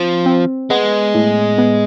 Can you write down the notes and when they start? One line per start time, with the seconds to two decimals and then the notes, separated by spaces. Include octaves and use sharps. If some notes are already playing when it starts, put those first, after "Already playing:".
Already playing: F3 C4
0.26 C4
0.70 G#3 B3
1.15 A2
1.58 B3